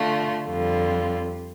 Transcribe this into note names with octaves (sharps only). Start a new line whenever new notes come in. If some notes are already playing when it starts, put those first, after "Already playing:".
Already playing: D3 A3 F4
F2 D3 G3 F4